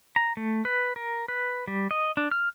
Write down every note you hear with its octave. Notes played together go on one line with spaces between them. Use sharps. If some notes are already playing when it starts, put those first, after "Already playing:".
A#5
A3
B4
A#4
B4
G3
D#5
D4
F6